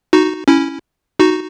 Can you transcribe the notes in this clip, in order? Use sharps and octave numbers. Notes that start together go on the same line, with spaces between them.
D#4 F#4
C#4 E4
D#4 F#4